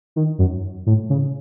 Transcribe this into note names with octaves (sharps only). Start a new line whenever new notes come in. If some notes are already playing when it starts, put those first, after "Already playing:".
D#3
F#2
A2
C#3